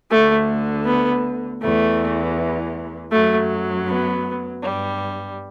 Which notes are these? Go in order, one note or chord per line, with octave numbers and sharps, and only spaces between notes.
D2 D3 A3
B3
E2 E3 A3
F#2 F#3 A3
B3
G2 G3